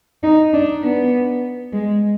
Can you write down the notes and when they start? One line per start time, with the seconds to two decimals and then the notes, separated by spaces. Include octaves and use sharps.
0.23 D#4
0.54 D4
0.83 B3
1.73 G#3